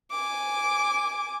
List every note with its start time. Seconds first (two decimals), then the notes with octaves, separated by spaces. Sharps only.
0.11 G#5 D6